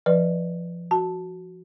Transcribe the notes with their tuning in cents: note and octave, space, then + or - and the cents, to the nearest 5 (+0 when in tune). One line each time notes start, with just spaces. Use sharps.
F3 -20 B4 +0 D5 +0
F#4 +0 A5 +0